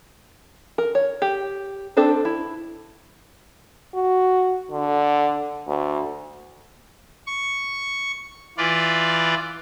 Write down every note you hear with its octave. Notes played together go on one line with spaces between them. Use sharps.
A#4
C#5
G4
C4 D4 A4 B4 C5
E4
F#4
D3
D2
C#6
E3 F4 B4 D5